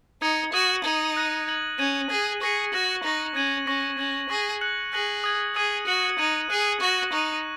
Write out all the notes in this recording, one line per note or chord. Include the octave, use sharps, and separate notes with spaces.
D#4 D#6 G#6 C#7
F#4 D#6 G#6 D#7 F#7
D#4 G#6 F#7
F#6 A#6 D#7
G#6 F#7
C#4 G#6 D#7 F#7
G#4 G#6 F#7
G#4 C#6 A#6 C#7
F#4 F#6 A#6 F#7
D#4 C#6 A#6 F#7
C#4 G#6 D#7 F#7
C#4 C#6 A#6 F#7
C#4 G#6 F#7
G#4 C#6 A#6 F#7
F#6 C#7 F#7
G#4 F#6 A#6 F#7
D#6 G#6 F#7
G#4 D#6 G#6 D#7 F#7
F#4 F#6 C#7 F#7
D#4 G#6 D#7 F#7
G#4 F#6 D#7 F#7
F#4 C#6 A#6 F#7
D#4 C#6 F#6 D#7 F#7